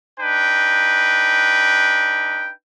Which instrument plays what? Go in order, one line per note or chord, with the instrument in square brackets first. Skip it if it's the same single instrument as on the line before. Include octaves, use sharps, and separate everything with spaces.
[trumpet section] D4 D#4 B4 G5